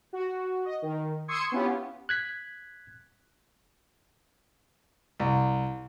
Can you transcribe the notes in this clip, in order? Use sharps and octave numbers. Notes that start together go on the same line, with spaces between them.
F#4
D#5
D#3
C6 C#6 D#6 E6 G#6 C#7
B3 C#4 E4 F4 G4
F#6 G#6 B6
C2